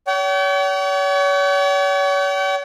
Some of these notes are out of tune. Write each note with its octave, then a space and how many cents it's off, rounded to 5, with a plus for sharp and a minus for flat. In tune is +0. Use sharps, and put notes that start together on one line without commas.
C#5 +40 G5 -45